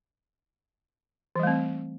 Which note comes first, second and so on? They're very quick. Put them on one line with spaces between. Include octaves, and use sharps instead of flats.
E3 G3 A3 C4